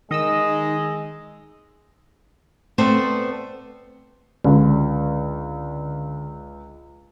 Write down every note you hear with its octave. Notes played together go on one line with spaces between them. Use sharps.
D#3 G#3 D#4 D#5 D#6 E6
A3 B3 C4 B4 C5 D5
C#2 D3